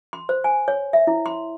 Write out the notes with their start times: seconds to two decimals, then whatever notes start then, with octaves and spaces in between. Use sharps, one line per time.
0.13 C6
0.29 C5
0.44 G#5
0.68 C#5
0.93 E5
1.07 E4
1.26 C6